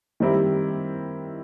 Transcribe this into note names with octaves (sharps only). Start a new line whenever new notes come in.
D#3 G3 C4 E4 G4